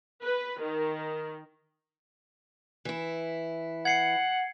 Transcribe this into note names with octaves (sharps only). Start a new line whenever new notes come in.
B4
D#3
E3 E4
F#5 G#6 C7 C#7